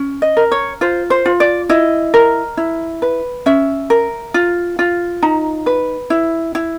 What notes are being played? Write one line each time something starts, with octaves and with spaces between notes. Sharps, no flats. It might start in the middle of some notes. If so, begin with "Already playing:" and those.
Already playing: C#4
D#5
A#4
C#5
F4 C5
C5
F4
D5
E4 D#5
A#4
E4
B4
C#4 E5
A#4
F4
F4
D#4 A#5
B4
E4
E4